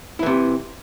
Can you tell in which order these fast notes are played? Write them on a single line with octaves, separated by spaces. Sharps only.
E4 E3 C3